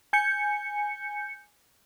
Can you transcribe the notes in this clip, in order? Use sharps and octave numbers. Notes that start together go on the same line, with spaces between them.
G#5 G6 C#7